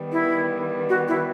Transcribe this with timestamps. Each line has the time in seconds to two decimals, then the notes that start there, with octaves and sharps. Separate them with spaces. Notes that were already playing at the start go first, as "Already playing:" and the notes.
Already playing: D#3 G3 B3
0.12 E4
0.89 F#4
1.08 E4